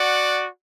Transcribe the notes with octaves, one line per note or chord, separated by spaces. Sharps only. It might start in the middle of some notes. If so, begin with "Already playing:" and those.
Already playing: F#4 D5 F#5